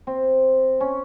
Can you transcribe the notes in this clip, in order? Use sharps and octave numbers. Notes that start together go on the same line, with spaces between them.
C4
C#4